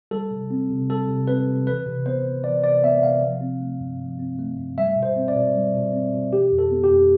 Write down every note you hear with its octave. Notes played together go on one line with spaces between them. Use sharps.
G3 A4
C3
C4
C3
G3 A4
C3
C4 B4
C3
E3 B4
C3
B3 C5
C3
E3 D5
C3 D5
B3 E5
C3 F5
F3
C4
A3
G2
F3
C4
A3
G2
G3 E5
B2
C5
C4
D5
B2
G3
B2
C4
B2
E3 G4
F2
A4
B3
G4
F2